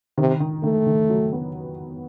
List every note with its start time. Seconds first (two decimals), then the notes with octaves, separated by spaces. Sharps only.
0.17 C3 D#3
0.40 D#3
0.63 D#3 A3
0.86 D#3
1.09 F#3
1.33 B3